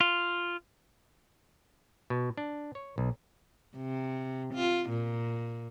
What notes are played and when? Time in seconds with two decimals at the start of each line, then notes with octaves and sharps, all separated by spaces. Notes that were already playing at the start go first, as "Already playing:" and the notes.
0.01 F4
2.10 B2
2.38 D4
2.75 C#5
2.98 B1
3.76 C3
4.54 F4
4.90 A#2